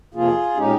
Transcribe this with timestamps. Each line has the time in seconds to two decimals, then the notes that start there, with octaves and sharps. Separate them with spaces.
0.14 F2 C3 F3 A#3 F4 G#4
0.57 A#2 G#3 C#4 D#4 G4